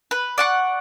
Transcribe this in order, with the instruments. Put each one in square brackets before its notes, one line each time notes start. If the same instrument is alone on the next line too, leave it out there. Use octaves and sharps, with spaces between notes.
[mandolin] B4
D5 F#5 C#6